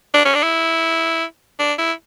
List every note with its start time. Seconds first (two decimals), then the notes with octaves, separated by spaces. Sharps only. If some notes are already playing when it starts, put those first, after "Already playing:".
0.14 D4
0.25 C#4
0.35 D4
0.43 E4
1.59 D4
1.78 E4